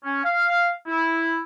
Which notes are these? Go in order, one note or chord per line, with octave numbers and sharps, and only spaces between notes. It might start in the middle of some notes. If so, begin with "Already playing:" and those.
C#4
F5
E4